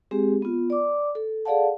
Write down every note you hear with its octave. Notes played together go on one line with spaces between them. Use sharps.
G#3 C4 G4 G#4
B3 F4
D5 D6
A4
G#4 A4 D5 F5 F#5 A5